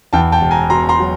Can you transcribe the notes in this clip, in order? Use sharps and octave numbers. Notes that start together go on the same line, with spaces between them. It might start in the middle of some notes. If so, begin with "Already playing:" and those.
E2 G5 A5
G5 A5
E1
G#5 A#5
B2 A#5 C6
A#5 C6
F#3